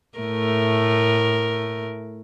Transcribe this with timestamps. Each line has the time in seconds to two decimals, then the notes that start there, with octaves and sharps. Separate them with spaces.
0.18 A2 A3 A#4